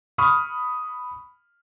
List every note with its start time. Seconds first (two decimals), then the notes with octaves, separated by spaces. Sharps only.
0.18 B5 C#6 D#6 F6